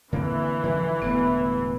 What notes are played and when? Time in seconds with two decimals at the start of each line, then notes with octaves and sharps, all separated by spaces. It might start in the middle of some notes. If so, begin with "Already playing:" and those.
0.13 D3 E3 A#3 C4
0.64 D3 D#3 F3
1.02 E1 A2 D3 B3